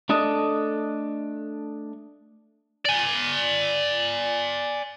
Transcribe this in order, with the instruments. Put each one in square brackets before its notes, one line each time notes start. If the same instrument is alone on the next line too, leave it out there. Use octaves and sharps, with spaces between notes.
[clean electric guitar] A3 D4 A4 D#5
[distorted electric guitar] D5 G#5